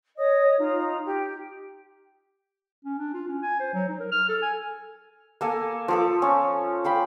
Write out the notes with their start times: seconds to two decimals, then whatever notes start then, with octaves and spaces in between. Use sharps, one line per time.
0.17 C#5 D#5 D#6
0.57 D#4 F4 A#5
1.04 G4
2.85 C#4
2.99 D4
3.14 F4
3.27 C#4
3.42 G#5
3.60 C5
3.74 F#3
3.88 D#4
4.00 A#4
4.12 F6
4.29 A4
4.42 G#5
5.41 A#3 A4 G#5
5.88 F3 A4 D6
6.22 C#4
6.84 F5 G5 B5